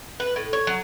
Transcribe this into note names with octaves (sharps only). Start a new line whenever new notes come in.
B4
A2
C#5
F#3